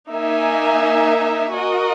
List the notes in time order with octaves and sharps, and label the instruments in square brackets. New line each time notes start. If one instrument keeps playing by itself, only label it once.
[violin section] A#3 D#4 A#4 E5 G#5
F#4 A#4 D#5